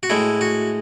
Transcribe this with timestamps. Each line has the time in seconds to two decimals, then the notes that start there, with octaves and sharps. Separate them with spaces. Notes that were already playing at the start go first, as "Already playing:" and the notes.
0.03 F#4
0.10 A2 G#3 E4
0.41 F#4